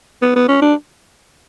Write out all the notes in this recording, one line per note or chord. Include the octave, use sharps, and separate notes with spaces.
B3
B3
C#4
D4